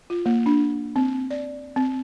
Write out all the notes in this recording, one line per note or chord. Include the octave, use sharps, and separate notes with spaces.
F4
A#3
D4
C4
D5
C4